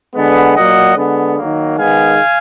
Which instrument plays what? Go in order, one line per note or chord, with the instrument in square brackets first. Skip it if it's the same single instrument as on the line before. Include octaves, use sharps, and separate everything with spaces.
[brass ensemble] D3 G#3 B3
A#2 F#3 A#3 D#5 F#5
D3 G#3 B3
D#3 F#3 A#3
D#3 G#3 B3 F5 G#5